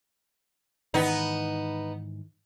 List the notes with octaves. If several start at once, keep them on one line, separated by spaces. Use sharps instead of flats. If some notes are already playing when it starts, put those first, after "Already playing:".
G#2 D#3 E3 B3 D#4